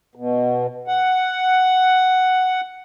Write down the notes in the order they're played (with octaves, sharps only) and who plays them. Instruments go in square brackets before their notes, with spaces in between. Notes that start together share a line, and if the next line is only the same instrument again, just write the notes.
[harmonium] B2
F#5